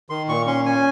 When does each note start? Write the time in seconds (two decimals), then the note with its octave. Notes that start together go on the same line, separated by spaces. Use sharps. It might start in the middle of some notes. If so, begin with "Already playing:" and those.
0.10 D#3 C6
0.28 A#2 C#6
0.47 C#4 C6
0.66 C#4 G#5